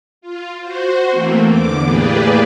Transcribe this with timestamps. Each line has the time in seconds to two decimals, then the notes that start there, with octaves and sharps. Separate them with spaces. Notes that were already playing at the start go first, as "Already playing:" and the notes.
0.21 F4
0.60 F#4 C5
1.11 E3 A3 A#3 C4
1.44 E2 D3 D6
1.84 A2 A#3 G4 G#4 B4 D5